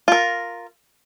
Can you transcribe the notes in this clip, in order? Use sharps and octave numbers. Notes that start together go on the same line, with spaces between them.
F4 A#4